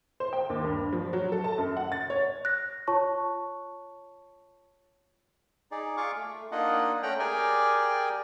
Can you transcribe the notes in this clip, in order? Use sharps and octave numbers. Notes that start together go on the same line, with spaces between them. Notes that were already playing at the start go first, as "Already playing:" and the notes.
C5
G5
D#2
G2
F3
F#3
A4
A5
F#2
F#5
A6
C#5
F#6 A#6
F4 C#5 A5 C#6
D#4 G#4 D5
F4 G#4 F5 C#6 D6
A3
A#3 D4 D#4 F4 D#5 F#5
A3 C#4 F#5 G5 A#5
G4 G#4 A#4 D5 G5 G#5